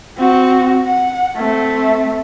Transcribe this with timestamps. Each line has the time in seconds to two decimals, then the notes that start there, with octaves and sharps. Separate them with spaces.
0.17 C4 F#4
0.85 F#5
1.36 A3 C4